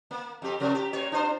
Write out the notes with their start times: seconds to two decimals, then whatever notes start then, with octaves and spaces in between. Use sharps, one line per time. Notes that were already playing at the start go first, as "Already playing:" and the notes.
0.11 A#3
0.42 F2 G4
0.60 C3 F3 A#4
0.75 G4
0.93 A#2 C#5
1.12 D4 F4 C5